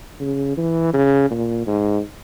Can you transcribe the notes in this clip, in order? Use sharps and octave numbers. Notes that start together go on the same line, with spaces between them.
C#3
E3
C#3
A#2
G#2